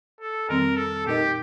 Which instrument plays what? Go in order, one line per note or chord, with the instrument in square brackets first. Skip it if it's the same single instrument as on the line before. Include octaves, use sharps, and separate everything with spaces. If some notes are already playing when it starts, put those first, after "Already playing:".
[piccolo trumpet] A4
[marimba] F2 D#3 G3 C4 [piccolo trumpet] A#4
[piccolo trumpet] A4
[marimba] A#2 A3 D#4 A#4 D#5 [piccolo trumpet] G4